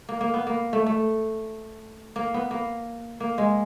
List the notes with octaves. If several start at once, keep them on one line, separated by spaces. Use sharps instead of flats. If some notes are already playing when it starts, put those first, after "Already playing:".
A#3
A#3
B3
A#3
A3
A3
A#3
B3
A#3
A#3
G#3